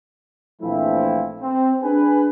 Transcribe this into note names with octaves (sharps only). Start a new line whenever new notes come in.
A#1 E3 F3 A3 C4 E4
C4
D4 G#4 B4 G#5